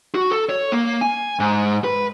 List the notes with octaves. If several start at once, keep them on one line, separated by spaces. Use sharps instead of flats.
F#4
A4
C#5
A#3
G#5
G#2
B4